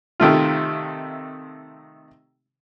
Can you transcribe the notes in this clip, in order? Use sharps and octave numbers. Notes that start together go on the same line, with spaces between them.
C3 D#3 A3 F4